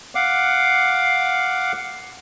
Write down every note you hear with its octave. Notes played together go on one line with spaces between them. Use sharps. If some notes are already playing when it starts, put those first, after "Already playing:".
F5 F#5 D6